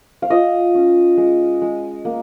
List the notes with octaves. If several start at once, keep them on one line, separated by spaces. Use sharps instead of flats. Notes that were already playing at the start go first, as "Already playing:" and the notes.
F5
F4 D#5
C#4
G#3
G#3
A#3